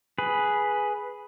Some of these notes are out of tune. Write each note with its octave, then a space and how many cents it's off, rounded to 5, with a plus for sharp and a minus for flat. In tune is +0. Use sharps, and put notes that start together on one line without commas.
G#4 +0 B4 +0